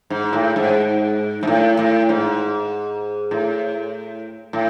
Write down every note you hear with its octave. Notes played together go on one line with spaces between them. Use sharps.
G#2
A2
G#2
G#2
A2
A2
G#2
A2
A2